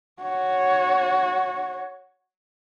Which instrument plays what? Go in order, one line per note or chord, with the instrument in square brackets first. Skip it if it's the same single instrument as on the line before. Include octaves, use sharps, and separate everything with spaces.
[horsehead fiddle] F#4 C#5